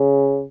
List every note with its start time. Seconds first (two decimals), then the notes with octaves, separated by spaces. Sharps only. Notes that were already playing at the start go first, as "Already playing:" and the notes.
Already playing: C#3